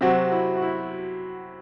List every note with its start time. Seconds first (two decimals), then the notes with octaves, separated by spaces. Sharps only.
0.01 C3 F#3 C4 F#4
0.32 E4
0.55 F#4
0.62 E4